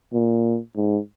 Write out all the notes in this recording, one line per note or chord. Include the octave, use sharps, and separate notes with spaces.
A#2
G#2